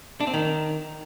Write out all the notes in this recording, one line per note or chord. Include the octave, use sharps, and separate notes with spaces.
D4
C4
D#3